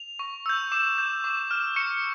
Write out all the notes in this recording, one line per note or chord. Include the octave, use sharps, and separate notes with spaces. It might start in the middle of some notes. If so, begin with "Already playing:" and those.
Already playing: F7
C#6
E6 G6
D6 E7
G6
D6
F6
C#6 C#7